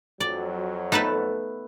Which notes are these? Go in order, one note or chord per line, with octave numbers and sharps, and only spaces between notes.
F2 F#3 D5
A3 B3 D#4 B4 A5